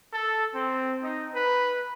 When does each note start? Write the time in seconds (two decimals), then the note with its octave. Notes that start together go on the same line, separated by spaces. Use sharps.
0.13 A4
0.54 C4
1.02 D#4
1.34 B4